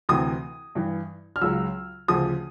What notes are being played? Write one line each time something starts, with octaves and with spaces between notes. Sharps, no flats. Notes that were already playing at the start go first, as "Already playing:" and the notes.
D2 C3 E3 D#6
G2 E3
F6
C#2 C#3 F#3 E6
D2 C#3 F3 D#6